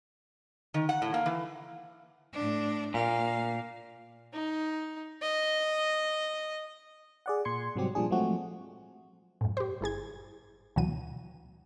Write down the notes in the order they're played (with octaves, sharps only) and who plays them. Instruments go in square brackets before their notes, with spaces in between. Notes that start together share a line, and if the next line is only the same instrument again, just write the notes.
[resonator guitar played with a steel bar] D#3
F#5
A2
A#3
E3
[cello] A2 D4
[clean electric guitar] A#2 [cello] A#3 F5
[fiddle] D#4
D#5
[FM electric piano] G#4 D5 F#5
A#2 C6 G#6 C#7
G#2 C3 F#3 G3 C4 G4
A#2 F3 G3 D4 G#4
F3 F#3 G#3 A3 C4 F#4
[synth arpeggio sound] F#2 A2
G4 C5
G1 E4 G#4 G#6
D2 B2 E3 F#3 D#7